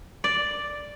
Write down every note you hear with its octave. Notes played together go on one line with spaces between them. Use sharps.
D5